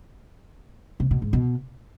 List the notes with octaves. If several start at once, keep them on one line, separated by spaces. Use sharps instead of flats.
C3
B2
G#2
B2